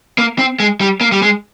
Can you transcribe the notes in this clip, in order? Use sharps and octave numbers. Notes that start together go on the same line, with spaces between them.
A#3
C4
G#3
G3
A#3
G3
G#3